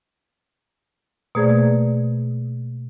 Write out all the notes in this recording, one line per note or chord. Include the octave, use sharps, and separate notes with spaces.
B2 A3 A#3 G#4 C5 D5